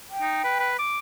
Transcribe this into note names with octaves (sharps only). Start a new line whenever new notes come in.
G5
D#4
B4
B4
D6